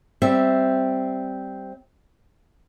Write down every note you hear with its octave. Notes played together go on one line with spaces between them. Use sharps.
G3 C4 E5